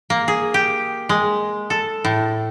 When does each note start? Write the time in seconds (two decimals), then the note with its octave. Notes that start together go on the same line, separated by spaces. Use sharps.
0.10 A#3
0.28 G#4
0.54 G4
1.09 G#3
1.70 A4
2.05 A2